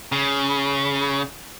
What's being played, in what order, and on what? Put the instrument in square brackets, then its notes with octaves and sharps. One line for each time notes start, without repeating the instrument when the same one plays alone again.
[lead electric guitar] C#3